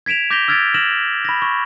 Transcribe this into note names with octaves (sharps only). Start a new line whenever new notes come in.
G#6 B6 D7 E7 F7
D6 G6 A#6 B6 F7 G7
E6 F6 G#6 A6 B6 D7
F6 A#6 E7 F#7
B5 A#6
C#6